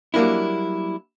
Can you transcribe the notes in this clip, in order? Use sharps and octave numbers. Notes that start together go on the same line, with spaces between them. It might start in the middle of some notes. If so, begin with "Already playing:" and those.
F#3 G3 A#3 D4 E4